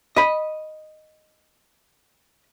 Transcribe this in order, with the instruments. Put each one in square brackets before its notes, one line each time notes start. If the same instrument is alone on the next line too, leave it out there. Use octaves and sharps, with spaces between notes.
[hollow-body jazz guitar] D#5 B5